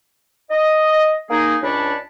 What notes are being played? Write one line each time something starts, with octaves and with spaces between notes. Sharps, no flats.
D#5
A#3 D#4 G#4
C#2 D4 C#5 D5 A5 B5